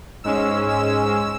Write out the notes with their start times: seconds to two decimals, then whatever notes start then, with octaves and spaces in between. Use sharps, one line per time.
0.24 G#2 G#3 C#4 E6
0.69 E6